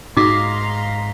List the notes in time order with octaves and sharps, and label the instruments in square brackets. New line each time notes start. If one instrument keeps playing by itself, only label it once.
[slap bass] G#2 [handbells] D#4 F#4 [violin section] F5 A#5 C6 [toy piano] D6 D#6